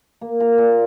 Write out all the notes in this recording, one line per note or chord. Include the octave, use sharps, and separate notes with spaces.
A#3
F4 A#4 F5
A#2